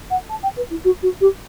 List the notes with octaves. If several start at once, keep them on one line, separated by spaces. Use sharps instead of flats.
F#5
A5
G5
B4
E4
F#4
F#4
G4